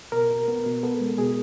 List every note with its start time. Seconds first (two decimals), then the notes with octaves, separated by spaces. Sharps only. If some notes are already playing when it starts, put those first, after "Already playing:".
0.12 B2 A#4
0.30 B2
0.48 B3
0.66 B2
0.83 B3 A4
1.00 G#3
1.18 B2 G#4